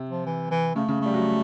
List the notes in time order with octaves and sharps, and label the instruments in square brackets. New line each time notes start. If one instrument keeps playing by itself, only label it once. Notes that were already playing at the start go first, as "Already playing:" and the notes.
Already playing: [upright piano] C3
[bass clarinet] F3
E3
E3
[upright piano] C#3 [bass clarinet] A3
[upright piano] C#3
[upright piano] G3 [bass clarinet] A3
[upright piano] F#3